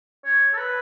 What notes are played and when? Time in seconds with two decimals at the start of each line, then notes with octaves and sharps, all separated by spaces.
0.25 C#5
0.53 A4
0.58 B4